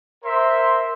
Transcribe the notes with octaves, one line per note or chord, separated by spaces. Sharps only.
A#4 C5 E5 C6